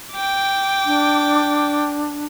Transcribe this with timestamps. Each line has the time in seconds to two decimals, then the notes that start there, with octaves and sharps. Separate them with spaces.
0.12 G5 D6
0.86 D4